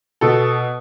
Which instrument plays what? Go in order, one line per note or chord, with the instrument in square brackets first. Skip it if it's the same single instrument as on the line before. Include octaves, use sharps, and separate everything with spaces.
[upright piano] B2 A4